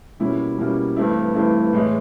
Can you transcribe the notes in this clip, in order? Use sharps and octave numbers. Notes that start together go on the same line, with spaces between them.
B2 G3 A#3 C#4 E4
B2 G3 A#3 C#4 E4
G2 E3 A3 C4 E4
G2 E3 A3 C4 E4
A2 E3 G#3